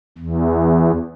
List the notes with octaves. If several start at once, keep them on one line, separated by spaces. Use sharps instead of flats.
E2